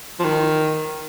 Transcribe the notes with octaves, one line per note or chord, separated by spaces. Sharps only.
F3
D#3